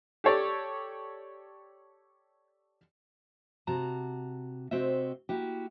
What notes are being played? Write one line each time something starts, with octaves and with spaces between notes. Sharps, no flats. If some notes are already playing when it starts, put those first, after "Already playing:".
G4 A4 C#5 D5
C3 F#4 A5 A#5
C3 C4 F#4 D#5 E5
A#3 E4 F#4 G4